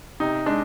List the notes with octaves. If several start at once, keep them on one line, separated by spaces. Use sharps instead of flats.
C3 D#4
G#3 D4